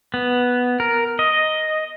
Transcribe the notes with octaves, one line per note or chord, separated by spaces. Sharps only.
B3
A#4
D#5